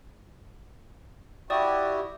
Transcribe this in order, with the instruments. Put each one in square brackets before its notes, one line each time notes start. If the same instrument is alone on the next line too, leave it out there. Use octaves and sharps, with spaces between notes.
[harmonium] E4 F#4 G4 [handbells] D5 D#6